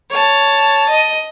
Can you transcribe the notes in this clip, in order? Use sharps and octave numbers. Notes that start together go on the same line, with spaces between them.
C#5 A5
D#5